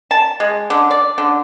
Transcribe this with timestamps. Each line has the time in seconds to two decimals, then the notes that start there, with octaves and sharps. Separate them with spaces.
0.11 A5
0.40 G#3
0.70 D3
0.91 D5
1.18 D3